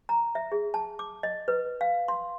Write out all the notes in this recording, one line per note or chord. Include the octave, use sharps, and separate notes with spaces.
A#5
E5
G#4
A5
D6
D#5
B4
F5
C6